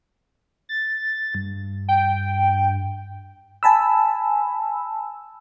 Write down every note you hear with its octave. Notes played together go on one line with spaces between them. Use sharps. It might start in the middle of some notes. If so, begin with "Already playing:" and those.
A6
G2
G5
G#5 A5 B5 E6